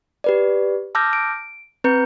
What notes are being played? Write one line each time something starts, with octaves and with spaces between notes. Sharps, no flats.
G4 B4 D5
A5 D6 E6 F6 G6 A#6
D7
C4 B4 A#5 G6 C#7